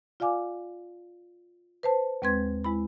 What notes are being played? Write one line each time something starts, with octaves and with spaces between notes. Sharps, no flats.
F4 D5 F5 G#5 D6
B4 C5 A5
D#2 G#3 C4 B4 C6 G#6
G#3 E4 B5